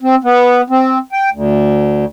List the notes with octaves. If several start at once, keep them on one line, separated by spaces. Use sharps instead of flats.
C4
B3
C4
G5
D2